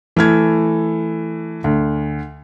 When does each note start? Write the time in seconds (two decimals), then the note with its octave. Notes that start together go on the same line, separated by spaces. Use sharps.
0.16 E3 A3 F6 G#6
1.64 D2